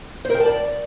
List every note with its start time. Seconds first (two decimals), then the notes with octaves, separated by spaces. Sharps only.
0.25 C5
0.30 A#4
0.35 G5
0.40 A5
0.45 D5